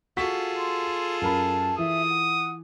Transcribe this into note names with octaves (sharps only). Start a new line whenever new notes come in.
F4 F#4 G#4 A4 C#6 B6
C6
F#2 A#4 A5 B5
E3 E5 D#6
F#5